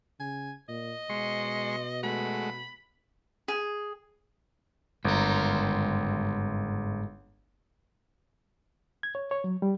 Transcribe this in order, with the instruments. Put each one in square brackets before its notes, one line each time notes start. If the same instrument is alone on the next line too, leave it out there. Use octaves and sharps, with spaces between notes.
[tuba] C#3 [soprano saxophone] G#5
[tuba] A#2 [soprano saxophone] D#5
[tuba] B2 [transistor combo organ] G#3 C6 C#6
[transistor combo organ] G#3 A3 F#4 [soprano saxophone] B5
[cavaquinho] G#4
[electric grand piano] G1 [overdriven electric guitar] G#2 A#4
[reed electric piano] G#6
C#5
C#5
F#3
G3